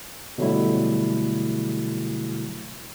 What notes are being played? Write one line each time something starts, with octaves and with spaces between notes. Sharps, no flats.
B2 D3 F#3 G3 A3 E4